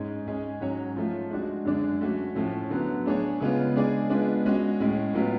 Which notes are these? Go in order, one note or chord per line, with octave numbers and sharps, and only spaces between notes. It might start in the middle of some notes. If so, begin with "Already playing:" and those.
Already playing: G#2 G#3 C#4
G#3 C#4 G#4
G#2 F#3 C#4 F#4 C#5
F3 A3 F4
G#3 D4 F#4
F#2 D3 G#3 D4
A3 C#4 F#4
A2 F3 A3 C#4
D3 F#3 B3
A3 D4 G#4 C#5
C#3 G#3 B3 F4
G#3 D4 G#4 D5
G#3 B3 D4 F4
G#3 C#4 F#4
A2 G#3 C#4
A2 F#3 B3 F4